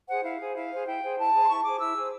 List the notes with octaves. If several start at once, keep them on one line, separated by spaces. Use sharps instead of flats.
G#4 C5 F#5
E4 F5
G#4 C5
E4 F5
G#4 C5
E4 G5
G#4 C5
E4 A5
G#4 C5
C6
E4 C#6
G#4 C5 D6
E4 E6
G#4 C5